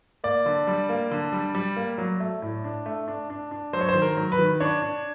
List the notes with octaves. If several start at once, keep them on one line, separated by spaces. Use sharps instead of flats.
A#3 D5
D3
G3
A#3
D3
G3
G3
A#3
F#3
A3
A2
D4
A3
D4
D4
D4
F#3 C5
C#5
C5
D#3
A#4
F#3
B4
D#3
D4 C#5
D4